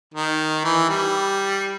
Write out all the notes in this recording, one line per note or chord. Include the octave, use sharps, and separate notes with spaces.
D#3
E3
G3